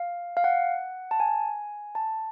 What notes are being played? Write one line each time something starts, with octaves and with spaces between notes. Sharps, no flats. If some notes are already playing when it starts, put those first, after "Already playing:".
Already playing: F5
F5
F#5
A5
G#5
A5